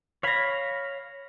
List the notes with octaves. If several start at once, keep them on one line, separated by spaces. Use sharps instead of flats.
C#5 F5 B5 G#6 A#6